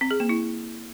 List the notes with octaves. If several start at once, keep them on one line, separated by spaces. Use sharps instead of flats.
C4
G#4
A#3
E4